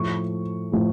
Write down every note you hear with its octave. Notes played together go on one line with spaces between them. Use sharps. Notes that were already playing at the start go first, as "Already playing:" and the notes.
Already playing: A2 F3 A3 C#6
A2 F3 A3